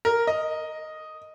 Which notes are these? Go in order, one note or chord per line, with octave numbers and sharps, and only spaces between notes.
A#4
D#5